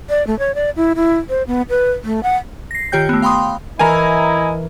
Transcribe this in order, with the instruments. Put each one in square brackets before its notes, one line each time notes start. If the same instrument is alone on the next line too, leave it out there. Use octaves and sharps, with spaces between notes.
[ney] D5
A3
C#5
D5
E4
E4
C5
B3
B4
A3
F#5
[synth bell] A#6 C7
D#3 F4 G4 C#5 G5 G6
A3 B3
F5 G5 B5 C6 D#6
[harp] E3 A#4 [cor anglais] E4 [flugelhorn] D#5 [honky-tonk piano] G#5 A#5